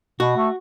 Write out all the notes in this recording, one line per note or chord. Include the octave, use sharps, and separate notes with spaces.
B2 F#4
A3